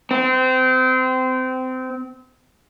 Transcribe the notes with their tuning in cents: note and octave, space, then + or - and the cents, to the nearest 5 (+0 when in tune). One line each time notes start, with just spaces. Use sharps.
C4 -25